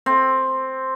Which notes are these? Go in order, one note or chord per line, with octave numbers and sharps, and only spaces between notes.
C4